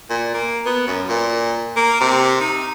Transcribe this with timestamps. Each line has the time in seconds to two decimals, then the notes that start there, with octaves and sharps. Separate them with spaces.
0.10 A#2
0.34 A#3
0.66 B3
0.87 F#2
1.09 A#2
1.76 A#3
2.01 C3
2.41 D#4